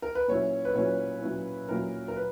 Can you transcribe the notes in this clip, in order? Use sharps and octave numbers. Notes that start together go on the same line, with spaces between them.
A#4
B4
A#2 F#3 C#4 E4 C#5
B4
A#2 F#3 C#4 E4 C#5
A#2 F#3 C#4 E4
A#2 F#3 C#4 E4 A#4
A#4
B4